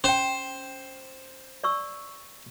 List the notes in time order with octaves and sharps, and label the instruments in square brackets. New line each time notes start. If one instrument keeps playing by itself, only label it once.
[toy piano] C#4 G5 [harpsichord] C5
[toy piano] D5 C#6 E6